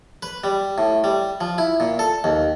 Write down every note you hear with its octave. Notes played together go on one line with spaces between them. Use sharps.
B4
G3
A2
G3
F3
E4
A#2
A4
D#2